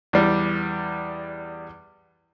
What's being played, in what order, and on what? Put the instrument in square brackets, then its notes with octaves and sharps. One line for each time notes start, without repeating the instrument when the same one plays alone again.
[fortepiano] E2 G3